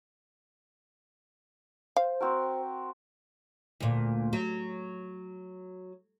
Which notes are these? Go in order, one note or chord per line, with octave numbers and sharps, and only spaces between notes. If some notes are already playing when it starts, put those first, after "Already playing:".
C5 F5
C4 F#4 A#4
D2 A#2
F#3